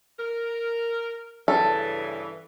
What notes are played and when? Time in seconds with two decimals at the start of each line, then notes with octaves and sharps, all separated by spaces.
0.19 A#4
1.48 G2 C#3 E3 A4